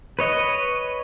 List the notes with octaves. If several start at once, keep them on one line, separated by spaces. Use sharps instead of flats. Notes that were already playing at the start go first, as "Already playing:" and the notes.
B4 C#5 D#5